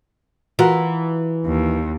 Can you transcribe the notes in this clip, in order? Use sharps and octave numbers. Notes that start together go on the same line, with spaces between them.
E3 F4 F#4 A#4
D#2